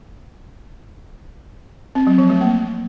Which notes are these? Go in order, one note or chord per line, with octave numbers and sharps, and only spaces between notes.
C4
F#3
F3
A3
A#3